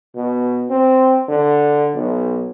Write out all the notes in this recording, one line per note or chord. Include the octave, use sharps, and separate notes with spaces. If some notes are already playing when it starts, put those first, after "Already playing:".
B2
C4
D3
B1